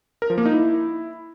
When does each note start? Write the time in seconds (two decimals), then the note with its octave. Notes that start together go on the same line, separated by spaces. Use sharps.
0.22 A#4
0.30 F3
0.38 A#3
0.46 D#4
0.53 E4